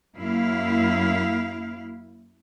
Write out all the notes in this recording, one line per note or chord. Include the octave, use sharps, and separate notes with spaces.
F#2 A#3 E4 F5